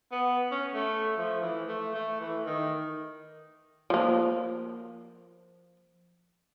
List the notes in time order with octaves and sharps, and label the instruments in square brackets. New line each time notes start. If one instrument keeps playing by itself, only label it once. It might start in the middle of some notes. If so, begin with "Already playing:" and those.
[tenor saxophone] B3
C#4
A3
F3
E3
A3
A3
E3
D#3
[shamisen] F3 A#3